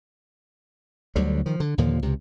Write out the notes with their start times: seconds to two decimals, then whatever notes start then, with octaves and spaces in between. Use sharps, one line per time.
1.16 D2 D3 F#3 G3
1.46 D#3 F3
1.60 D3
1.78 D#2 A#2 D3 F3
2.02 C#2 C3